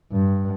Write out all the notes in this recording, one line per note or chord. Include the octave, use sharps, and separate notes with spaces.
G2